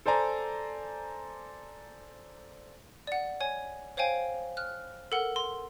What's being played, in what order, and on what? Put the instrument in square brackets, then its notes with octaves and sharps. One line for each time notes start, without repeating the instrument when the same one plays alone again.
[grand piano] A4 C5 D5 G#5 A#5
[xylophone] D5 F#5
C#5 G#5
C5 C#5 F5 G5 G#5
F6 F#6
A4 A#4 F#5
C6